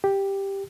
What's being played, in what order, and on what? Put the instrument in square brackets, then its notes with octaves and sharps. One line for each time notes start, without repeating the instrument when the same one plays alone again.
[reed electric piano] G4